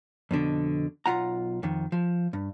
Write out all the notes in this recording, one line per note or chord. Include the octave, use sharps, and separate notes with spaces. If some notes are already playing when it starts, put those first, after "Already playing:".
F2 B2 D3
B1 F4 F#5 A#5
F2 D#3
F3
G2